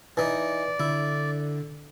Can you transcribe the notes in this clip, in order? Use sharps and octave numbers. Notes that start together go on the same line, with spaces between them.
E3 D#4 D5
D3 E4